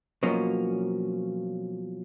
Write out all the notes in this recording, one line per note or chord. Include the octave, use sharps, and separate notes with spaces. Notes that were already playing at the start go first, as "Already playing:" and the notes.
B2 F3 F#3 A#3 C#4